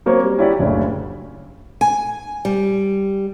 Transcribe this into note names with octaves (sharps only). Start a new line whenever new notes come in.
F#3 A#3 C4 C#4 C#5
G3
C#4 E4 F#4 G4 D5
F#1 D2 C#3
G#5
G3